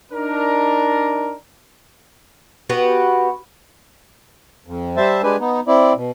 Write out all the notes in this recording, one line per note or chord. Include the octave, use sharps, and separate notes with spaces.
D4 D#4 A#4
B3 F#4 G4 B4
F2
G3 C5 E5 A5
G#3 D4 G4 B4 G#5
B3 D#4
C4 E4 D5
B2